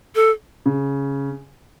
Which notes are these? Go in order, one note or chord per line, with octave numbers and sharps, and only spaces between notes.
A4
C#3